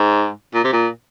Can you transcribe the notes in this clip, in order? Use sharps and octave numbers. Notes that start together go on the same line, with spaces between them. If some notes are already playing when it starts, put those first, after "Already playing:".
Already playing: G#2
A#2
C3
A#2